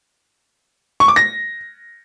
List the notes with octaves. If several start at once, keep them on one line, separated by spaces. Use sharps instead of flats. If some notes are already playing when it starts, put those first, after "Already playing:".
C#6
D6
A#6